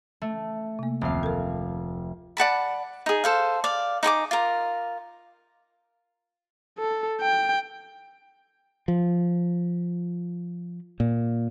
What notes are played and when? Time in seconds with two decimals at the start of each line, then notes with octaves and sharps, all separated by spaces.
0.22 A3 A5
0.79 C3 A#3
1.01 F1 D2 D#3 C4 F5
1.23 A4 A#4
2.37 D5 F#5 A5 B5
3.06 D#4 G#4
3.24 A4 C5 F5
3.64 D5 F5
4.03 D#4 G#4 G#5 D6
4.31 F4 A#4
6.79 A4
7.21 G5
8.88 F3
11.00 A#2